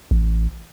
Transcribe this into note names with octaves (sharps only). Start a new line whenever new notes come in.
A1